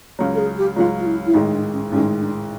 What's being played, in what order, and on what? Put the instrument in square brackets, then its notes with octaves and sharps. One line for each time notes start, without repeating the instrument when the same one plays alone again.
[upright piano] C#2 C#3 F#3
[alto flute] A4
G#4
G4
[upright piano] C#2 C#3 F#3 [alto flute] F4
[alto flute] F4
E4
E4
[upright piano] A1 G#2 D#3 G#3 [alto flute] D#4
[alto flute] D4
C#4
[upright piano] A1 G#2 D#3 G#3 [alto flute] C#4
[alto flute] D4